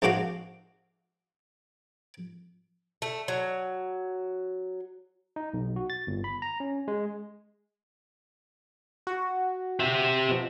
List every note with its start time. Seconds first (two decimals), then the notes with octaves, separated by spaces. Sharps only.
0.02 A#1 G#3 D4 F#4 F5
3.02 A3
3.28 F#3
5.36 D#4
5.54 B1
5.76 F#4
5.90 A6
6.07 G1
6.24 B5
6.42 A#5
6.60 C#4
6.88 G#3
9.07 F#4
9.79 G4 E5
10.29 B2 F3